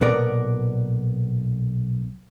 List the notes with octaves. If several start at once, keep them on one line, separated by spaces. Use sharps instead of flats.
B1 A#2 B3 A#4 D5